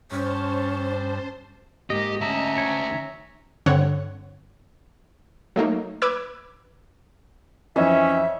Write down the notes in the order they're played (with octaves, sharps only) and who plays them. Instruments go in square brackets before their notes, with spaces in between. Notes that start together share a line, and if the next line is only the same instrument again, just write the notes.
[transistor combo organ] G2 [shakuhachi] C#4 [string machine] C5 A5 [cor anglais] C#5
[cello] G#2 A#3 [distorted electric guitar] G4 [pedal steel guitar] D#5
[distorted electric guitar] D2 A5 [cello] C#4 [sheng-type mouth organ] E5 A#5
[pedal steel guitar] C#5
[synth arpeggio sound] G2 D3 C4 C#5 F#5
F#3 A3 A#3 D#4
B4 D6 E6 G#6
[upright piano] F2 C4 [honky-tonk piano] E3 D#4 [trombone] C#4 [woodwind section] E5